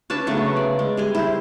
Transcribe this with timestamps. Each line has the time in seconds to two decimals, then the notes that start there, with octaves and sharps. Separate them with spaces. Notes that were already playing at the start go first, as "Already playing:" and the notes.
0.10 C#4 D4 B4 A5
0.27 C#3 F#3 A3 B3
0.57 D5
0.79 G#3
0.97 G3 G#4 G#5
1.15 E4 C5